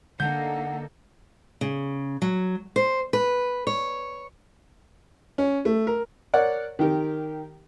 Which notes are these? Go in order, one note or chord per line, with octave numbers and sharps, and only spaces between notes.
D3 A#3 D#4 A4 F#5 G6
C#3
F#3
C5
B4
C#5
C#4
A3
A#4
A#4 C#5 D5 F#5
D#3 G4 A#4